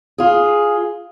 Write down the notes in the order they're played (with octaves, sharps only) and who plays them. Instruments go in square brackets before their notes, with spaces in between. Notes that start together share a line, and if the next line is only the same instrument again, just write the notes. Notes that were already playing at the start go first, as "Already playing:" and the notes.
[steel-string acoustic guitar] F4 G#4